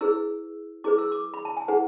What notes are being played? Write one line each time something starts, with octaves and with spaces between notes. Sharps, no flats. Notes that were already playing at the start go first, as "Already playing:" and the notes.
E4 G#4 B4 E6
E4 G#4 B4 D6
E6
D6
B5
A5
G#5
E4 G#4 B4 F#5